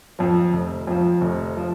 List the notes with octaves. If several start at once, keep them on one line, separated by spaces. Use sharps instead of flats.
F2 F3
F1
F2 F3
F1
F3